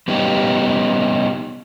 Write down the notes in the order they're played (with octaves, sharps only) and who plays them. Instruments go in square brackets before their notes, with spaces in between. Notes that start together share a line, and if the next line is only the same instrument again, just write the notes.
[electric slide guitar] G3 B3 C#4 D#4 G4